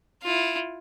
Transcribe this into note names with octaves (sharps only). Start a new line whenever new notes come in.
E4 F4